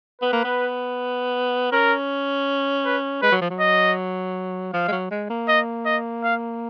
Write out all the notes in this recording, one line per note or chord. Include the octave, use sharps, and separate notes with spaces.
B3 B4
A#3
B3
C#4 A#4
B4
G#3 B4
F#3
F3
F#3
D#5
F3 F5
G#3
F#3
G#3
A#3
D#5
D#5
F5